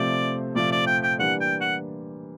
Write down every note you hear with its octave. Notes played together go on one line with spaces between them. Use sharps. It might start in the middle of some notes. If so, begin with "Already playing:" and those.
Already playing: C3 F3 A3 C4 F4 D5
C3 F3 A3 C4 F4 D5
D5
G5
G5
E3 G3 A#3 D4 F#5
G5
F#5